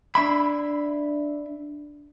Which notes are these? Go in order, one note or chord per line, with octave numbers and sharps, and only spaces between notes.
D4 E5 B5